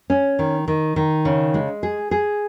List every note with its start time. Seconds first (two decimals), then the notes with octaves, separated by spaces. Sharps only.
0.10 C#4
0.39 D#3
0.68 D#3
0.96 D#3
1.25 C#3
1.54 G#3
1.83 G#4
2.11 G#4